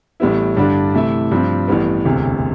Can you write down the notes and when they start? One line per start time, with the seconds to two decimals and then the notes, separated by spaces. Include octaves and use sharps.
0.20 A1 A2 G3 B3 E4
0.57 G2 D3 G3 D4
0.94 C3 E3 A3 E4
1.31 G2 F3 C4
1.68 A1 A2 G3 B3
2.05 E1 D2 C3